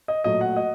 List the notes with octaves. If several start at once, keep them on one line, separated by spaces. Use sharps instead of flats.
D#5
A#2 F#3 A3 D#5
F#5
D#5